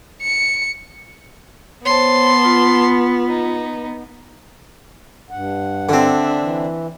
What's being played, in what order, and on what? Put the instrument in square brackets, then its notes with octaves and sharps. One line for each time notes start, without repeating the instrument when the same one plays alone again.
[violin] C#7
[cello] B3 [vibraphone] C5 C#5 [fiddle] A5 C6
[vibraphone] F4
[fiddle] D#4
[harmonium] G2 F#5
[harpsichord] D3 C4 [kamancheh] D4 E5
[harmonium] E3